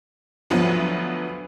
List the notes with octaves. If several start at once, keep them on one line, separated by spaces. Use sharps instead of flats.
D2 F3 F#3 B3